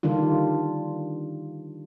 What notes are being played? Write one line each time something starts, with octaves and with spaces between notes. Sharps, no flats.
D3 D#3 G3 D4 F4